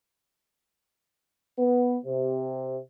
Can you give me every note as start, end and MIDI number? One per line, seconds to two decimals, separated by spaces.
1.58 1.96 59
2.05 2.78 48